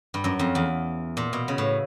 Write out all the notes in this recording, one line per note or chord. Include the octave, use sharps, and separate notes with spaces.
G2
F#2
F2
E2
A#2
B2
C#3
A2